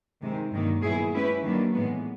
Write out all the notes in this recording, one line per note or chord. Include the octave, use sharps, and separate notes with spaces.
C3 D#3 G#3 C4
G2 D#3 F#3 A#3
A#2 F#3 B3 E4 G#4
G#3 C#4 E4 G4 B4
D#3 F#3 A#3 D4
A2 E3 G#3 B3